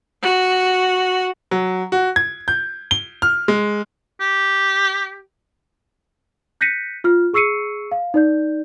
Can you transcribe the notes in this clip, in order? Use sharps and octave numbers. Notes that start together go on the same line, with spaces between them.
F#4
F#3
F#4
G#6
G6
G7
F6
G#3
G4
F#6 G6 A#6 B6 C#7 D#7
F4 F6
G#4 C#6 E6 C7 C#7 D#7
F5
D#4 D5 G6